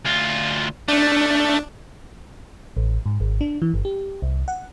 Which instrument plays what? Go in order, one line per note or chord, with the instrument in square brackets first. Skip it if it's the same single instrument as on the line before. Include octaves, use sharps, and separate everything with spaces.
[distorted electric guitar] D2 F4
[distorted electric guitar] A3 [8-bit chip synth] D4
[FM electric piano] A1
G#2
G#1
D4
E3
G1
G4
C2
F#5